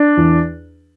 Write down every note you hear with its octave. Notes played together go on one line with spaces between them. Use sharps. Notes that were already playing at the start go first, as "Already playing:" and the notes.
Already playing: D4
E2